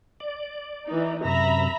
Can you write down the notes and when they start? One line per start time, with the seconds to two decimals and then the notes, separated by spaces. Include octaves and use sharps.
0.20 D5
0.87 E3 D#4
1.25 F#2 C3 E5 A#5 B5